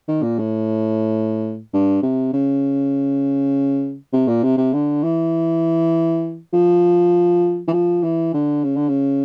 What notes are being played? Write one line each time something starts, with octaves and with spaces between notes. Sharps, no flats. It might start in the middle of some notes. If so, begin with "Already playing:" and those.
D#3
A#2
A2
G2
C3
C#3
C3
A#2
C3
C3
D3
E3
F3
E3
F3
E3
D3
C#3
D3
C#3